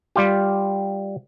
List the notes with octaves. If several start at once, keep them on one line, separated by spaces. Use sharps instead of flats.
G3 F4 G4